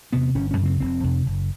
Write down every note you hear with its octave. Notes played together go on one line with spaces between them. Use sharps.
E2 C3 B3
G1 C#4
C#4
F#2
C#3 C4
F1 C4
F2 C3
F#1